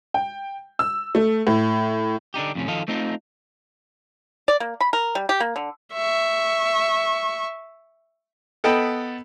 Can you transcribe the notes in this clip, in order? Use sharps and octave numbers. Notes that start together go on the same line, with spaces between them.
G5
E6
A3
A2
D3 D4 D#4 G4
F2 A2 C3 C#4
D#3 F3 A4 D#5 F5
A3 C4 D#4 F4
D5
A#3
B5
A#4
G3
G4
A#3
D3
E5 C#6
B3 A4 D#5 G5 A5 B5